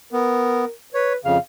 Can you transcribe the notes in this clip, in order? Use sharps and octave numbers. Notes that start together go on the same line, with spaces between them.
B3 A#4
B4 C#5
F2 C#3 F5